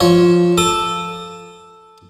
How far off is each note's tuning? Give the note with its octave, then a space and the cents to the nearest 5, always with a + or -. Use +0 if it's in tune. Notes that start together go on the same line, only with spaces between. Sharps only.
F3 +0 C#5 +0
A4 +0 D#6 -35